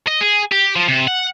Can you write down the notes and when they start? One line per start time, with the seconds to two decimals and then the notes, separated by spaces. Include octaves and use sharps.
0.07 D#5
0.21 G#4
0.52 G4
0.76 F3
0.88 C3
1.07 F#5